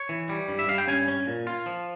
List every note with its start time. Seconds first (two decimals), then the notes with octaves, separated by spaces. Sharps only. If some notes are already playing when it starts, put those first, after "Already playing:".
Already playing: C#5
0.09 E3
0.29 G3
0.49 G2
0.59 E5
0.69 G2 F5
0.78 G5
0.88 C#4 G#5
1.08 C#4
1.27 A#2
1.47 F4
1.66 F3